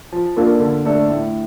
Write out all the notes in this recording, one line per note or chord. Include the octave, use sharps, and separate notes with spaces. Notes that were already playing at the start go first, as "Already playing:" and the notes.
F3
A#3 D4 F4 A4
D3
A3 D4 A4 D5
A2